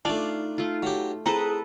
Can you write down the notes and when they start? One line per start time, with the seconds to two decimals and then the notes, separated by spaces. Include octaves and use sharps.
0.05 A3 D4 D#4 F4 D5 F5 A5
0.58 A3 F4
0.83 F#3 G4
1.26 C4 E4 G#4 A4 B4 D#5 A#5